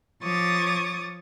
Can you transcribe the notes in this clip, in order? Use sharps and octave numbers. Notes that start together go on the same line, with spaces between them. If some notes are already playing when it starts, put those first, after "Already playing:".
F3 C#5 D6 D#6 A6